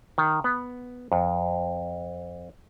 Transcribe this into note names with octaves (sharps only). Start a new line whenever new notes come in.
D#3
B3
F2